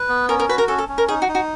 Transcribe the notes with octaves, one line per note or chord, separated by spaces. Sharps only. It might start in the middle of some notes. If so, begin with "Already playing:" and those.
Already playing: B4
B3
C#4 A#4
A#4
F#4 B4
A#4
C#4 A4
A4
C#4
A#4
D#4 G#4
F#4
D#4
F#4